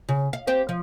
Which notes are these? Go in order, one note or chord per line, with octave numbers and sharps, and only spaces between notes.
C#3
F5
C4 G4 C5
F3